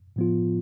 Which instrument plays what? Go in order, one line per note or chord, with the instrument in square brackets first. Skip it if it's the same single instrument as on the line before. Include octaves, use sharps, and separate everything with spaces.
[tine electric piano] A2 F3 B3 F4